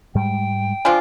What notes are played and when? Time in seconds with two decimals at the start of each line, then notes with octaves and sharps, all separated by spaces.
0.15 G#2 G3 G#3 G5
0.85 F3 D4 F4 G#5